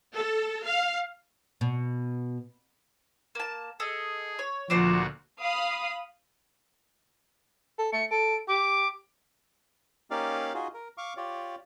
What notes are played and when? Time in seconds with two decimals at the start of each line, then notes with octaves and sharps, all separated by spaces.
0.15 A4
0.65 F5
1.61 B2
3.35 A#3 A5
3.80 G#4 A4 D#5
4.39 C#5
4.70 D2 A#2 F3 D4 F#4 C5 D5
5.40 F5 B5 D#6
7.79 A4
7.93 A3 C#7
8.11 A4 D7
8.48 G4 D6
10.11 A#3 C#4 D#4 G4 D5 F5
10.54 D#4 F4 F#4 G#4
10.74 A#4
10.98 F5 C#6 D6
11.17 F4 G4 C#5 D5